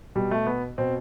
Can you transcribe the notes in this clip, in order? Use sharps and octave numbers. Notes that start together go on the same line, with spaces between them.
B2 G3
A3
B3
B2 C4